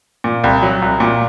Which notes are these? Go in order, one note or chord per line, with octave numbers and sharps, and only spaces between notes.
A#2
C2
F#3
C2
A#2